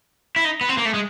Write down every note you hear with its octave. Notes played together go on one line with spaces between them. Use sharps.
E4
D#4
B3
C4
A#3
A3
G#3